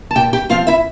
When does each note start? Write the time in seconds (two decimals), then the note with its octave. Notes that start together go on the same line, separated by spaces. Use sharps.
0.11 A5
0.15 A#2 G4 G5
0.33 G4 G5
0.49 F3 C4 F4 F5
0.67 E4 E5